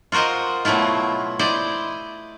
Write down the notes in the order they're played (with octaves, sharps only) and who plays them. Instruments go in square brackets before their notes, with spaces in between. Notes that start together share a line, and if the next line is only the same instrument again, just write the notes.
[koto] F4 F#4 A#4 C5 D#5
B2 F#3 A3 E4 F4
E4 C5 D5 D#5